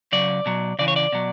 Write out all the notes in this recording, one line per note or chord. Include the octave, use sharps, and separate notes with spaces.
C#3 F#3 D5
B2 F#3
C#3 E3 D5
C#5
D5
B2 F#3